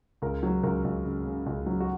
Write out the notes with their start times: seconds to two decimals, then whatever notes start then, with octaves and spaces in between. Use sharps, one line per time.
0.22 C#2 A#4
0.43 F#3
0.63 C#2 A#4
0.84 C#2
1.04 C#3
1.26 C#3
1.46 C#2
1.66 F#3
1.80 F#4